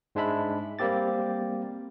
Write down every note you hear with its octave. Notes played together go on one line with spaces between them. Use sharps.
G#2 G#3 D4 E5 B5
G3 A#3 C4 G4 A6